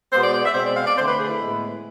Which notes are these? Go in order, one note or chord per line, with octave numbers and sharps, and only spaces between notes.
B2 G#3 B3 C5
D5
D5
E5
B2 G#3 C4 C5
D5
F5
D5
D3 A3 C4 C5
B4
G#4
E4
A2 G#3 B3